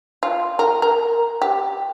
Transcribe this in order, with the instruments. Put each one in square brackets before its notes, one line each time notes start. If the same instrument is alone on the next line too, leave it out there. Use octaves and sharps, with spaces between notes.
[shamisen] F4
A#4
A#4
G4